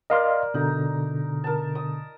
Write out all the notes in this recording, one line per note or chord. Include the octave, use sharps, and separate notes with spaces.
A#4 D5 D#5 F5 C6
B2 D3 D#4
A#4 A5
D#6